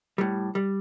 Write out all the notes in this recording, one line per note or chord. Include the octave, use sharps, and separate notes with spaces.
A2 G3
G3